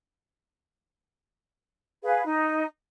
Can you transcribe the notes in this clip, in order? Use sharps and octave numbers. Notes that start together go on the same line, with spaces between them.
G#4 B4 F5
D#4